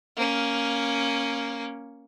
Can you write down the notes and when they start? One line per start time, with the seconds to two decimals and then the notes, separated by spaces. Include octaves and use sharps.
0.17 A#3 C#4